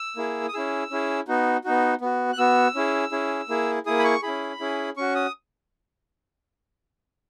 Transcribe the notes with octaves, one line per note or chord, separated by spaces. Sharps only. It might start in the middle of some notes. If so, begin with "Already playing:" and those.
Already playing: E6
A#3 E4 G#4
D#6
C#4 E4 G#4 E6
C#4 E4 G#4
B3 D#4 F#4
B3 D#4 F#4
B3 F#4
F#6
B3 F#4 E6
C#4 E4 G#4
C#4 E4 G#4
A#3 E4 G#4
A#3 E4 G#4 D#6
B5
C#6
C#4 E4 G#4 B5
C#4 E4 G#4
C#4 F#4 C#6
D#6